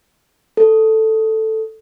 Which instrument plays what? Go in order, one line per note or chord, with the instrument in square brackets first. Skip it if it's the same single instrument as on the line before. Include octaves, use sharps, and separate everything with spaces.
[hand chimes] A4